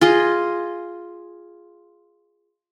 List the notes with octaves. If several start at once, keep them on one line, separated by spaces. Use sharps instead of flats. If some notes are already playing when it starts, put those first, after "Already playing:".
F4 G#4 D#5